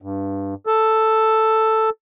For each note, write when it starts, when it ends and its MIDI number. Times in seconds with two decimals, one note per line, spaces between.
0.02 0.54 43
0.66 1.90 69